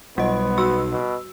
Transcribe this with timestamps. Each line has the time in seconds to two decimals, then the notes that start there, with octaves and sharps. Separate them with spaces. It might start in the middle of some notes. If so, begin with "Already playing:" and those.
0.18 B1 G3 B3 D#5
0.58 F#4 E6
0.92 B2